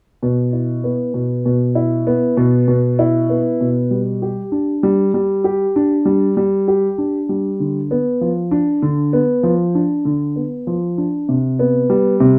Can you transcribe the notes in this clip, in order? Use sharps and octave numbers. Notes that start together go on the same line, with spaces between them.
B2
E4
B3
B2
B2
E4
B3
B2
B2
E4
B3
B2
G3
G4
D4
G3
G3
G4
D4
G3
G3
G4
D4
G3
D3
B3
F3
D4
D3
B3
F3
D4
D3
B3
F3
D4
C3
B3
G3
C3